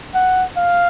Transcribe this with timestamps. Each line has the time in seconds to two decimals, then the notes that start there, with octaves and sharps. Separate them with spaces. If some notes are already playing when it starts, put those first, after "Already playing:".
0.15 F#5
0.57 F5